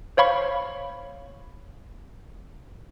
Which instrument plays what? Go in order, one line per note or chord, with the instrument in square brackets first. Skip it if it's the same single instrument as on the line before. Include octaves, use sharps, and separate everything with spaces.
[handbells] C5 C#5 F5 B5 C#6